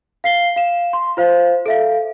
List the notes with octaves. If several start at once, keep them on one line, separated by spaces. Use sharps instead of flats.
F5 C7 G7
F5 E7
C6
F4 C5 F5
A4 E5 F5